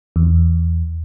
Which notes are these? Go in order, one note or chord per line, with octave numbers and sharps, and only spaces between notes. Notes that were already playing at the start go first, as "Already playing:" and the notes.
E2